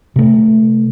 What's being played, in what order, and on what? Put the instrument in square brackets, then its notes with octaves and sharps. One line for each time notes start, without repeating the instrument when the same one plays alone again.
[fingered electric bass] C3 A3